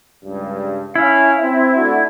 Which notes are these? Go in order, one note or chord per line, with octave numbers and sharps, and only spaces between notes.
C#2 G2
C#4 E4 F5
C4
A3 D4 F#4